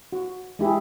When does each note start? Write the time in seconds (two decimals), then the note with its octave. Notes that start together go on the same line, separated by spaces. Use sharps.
0.12 F#4
0.59 G#3 E4 G4 G#4